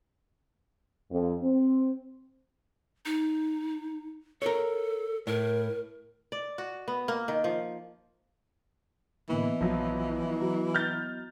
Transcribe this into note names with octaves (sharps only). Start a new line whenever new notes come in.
F2
C4
D#4
A4 A#4 C#5
A2 A#4
D5
F#4
B3
A#3
D#3
F3
A2 D3 E3 A#3 B3 D#5
A#1 F3 F#3
F#3 F#4 A#5
F6 G6 A6